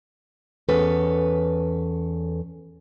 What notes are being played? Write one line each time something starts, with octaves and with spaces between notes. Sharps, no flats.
E2 C#4 A4 B4